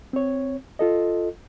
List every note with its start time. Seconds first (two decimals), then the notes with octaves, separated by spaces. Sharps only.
0.13 C4 C#5
0.79 F4 A4 D#5